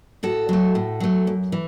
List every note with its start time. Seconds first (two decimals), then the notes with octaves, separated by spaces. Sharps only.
0.23 A2 F#4 A4
0.49 F#3 A3
0.75 A2
1.00 F#3 A3
1.27 F#2
1.52 E3